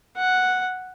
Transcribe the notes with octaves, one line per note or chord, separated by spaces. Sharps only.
F#5